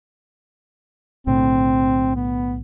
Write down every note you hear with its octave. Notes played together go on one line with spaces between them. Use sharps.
B1 A2 D3 C4
B3